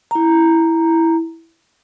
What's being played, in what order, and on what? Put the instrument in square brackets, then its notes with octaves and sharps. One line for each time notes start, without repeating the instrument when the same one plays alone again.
[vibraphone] E4 A#5